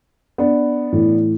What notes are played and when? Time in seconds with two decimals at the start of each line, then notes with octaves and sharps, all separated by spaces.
0.38 B3 D4
0.92 A2 E3